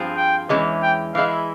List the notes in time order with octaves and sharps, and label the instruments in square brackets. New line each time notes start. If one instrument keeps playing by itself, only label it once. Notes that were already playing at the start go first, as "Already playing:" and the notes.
Already playing: [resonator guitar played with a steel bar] G2 F3 C4 F4 G#4
[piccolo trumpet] G5
[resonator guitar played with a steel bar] E2 E3 G#3 C#4
[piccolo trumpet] G5
[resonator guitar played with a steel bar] E3 G#3 E4 [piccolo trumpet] F5